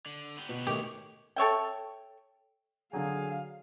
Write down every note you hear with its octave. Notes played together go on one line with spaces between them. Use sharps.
D3
B3 G4
B2
C#2 D#3 A3 G4 C#5
A4 C#5 E5 G5
D3 F#3 G#4 F5 G#5